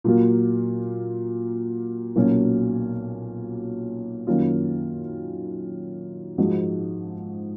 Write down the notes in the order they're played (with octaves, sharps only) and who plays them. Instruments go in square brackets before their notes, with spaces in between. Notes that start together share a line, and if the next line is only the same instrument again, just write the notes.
[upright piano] A#2 F#3 A#3 F4
B1 A#2 F#3 A#3 C#4
F#2 D#3 A#3 C#4 F4
G#2 F3 G#3 D#4 F#4